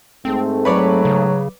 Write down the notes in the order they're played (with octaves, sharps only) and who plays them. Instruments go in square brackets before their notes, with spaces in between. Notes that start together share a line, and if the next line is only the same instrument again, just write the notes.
[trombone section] G#2 A3 [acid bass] C4
[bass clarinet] F#3 [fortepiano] B4 C#5 D5
[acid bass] C#3